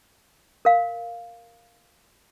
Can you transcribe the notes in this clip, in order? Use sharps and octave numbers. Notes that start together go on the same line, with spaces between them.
A#4 F5